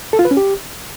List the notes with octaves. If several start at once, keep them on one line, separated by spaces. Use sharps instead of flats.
A4
F4
B4
C#4
G4